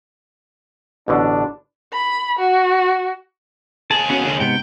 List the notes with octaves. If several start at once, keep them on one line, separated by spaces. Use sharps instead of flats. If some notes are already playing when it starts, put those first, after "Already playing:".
A1 B2 D3 D4
B5
F#4
D#2 G#4 A5
B3 C#4 F#4
D3
G#2 C3 B3 G5